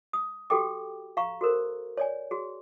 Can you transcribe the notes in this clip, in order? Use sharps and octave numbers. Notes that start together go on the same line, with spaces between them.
D#6
F#4 G4 A4 G5 D6
F5 A#5 C#6
F#4 A4 A#4 C5
C#5 D5 G#5
F#4 G#4